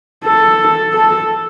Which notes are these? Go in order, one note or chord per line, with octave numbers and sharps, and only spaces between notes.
A4
A4